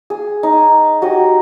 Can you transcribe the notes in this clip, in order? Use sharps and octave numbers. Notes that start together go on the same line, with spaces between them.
G#4
D#4
F#4 G4 D#5